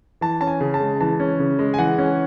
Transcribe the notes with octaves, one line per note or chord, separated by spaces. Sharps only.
E3 A5
C#4 A5
G#5
C#3
A5
G#3
E3 A5
C#4
C#3
G#3
G#5
E3 F#5
C#4